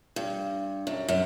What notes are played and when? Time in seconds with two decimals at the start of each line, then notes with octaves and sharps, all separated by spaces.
0.16 G2
0.87 F#2
1.08 F#2